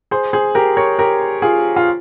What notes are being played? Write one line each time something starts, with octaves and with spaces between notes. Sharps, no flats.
G#4 C5
G#4 C5
G4 A#4
A#4 C#5
G4 A#4
F4 G#4
F4